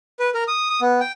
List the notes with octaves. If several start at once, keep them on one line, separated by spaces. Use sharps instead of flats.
B4
A#4
D#6
D#6
B3
G5